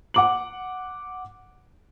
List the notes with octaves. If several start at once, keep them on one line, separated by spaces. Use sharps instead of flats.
F#5 D6 F#7